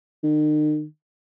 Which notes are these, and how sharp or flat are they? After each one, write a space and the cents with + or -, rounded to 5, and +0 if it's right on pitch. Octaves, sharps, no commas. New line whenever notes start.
D#3 -45